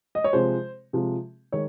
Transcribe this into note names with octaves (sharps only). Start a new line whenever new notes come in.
D#5
C#5
C3 F3 G#3 C5
C3 F3 G#3
D#3 G#3 C#5